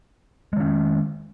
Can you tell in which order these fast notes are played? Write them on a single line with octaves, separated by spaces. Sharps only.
G#3 D#3 C#4